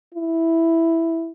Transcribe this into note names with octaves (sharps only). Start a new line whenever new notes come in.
E4